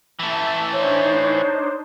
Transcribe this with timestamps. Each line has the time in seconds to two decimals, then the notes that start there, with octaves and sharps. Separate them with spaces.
0.19 E3 A3 E5 A5
0.73 D4 D#4 C5 C#5